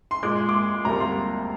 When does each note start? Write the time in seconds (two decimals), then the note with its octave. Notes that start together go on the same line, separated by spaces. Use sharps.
0.11 C6
0.23 A#2 G#3 D6
0.49 D6
0.54 C6
0.85 D2 C3 G3 A#3 A#5
1.00 C6